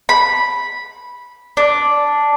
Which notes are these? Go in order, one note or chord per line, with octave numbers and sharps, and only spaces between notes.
B5
D4